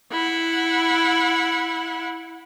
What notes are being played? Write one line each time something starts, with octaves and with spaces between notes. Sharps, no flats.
E4 F#5